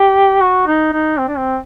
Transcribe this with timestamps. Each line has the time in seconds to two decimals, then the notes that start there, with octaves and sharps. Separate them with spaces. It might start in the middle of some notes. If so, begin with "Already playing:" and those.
Already playing: G4
0.41 F#4
0.67 D#4
0.93 D#4
1.18 C4
1.28 D4
1.37 C4